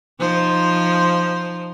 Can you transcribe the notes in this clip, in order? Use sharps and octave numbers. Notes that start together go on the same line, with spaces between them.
F3 D#4 C5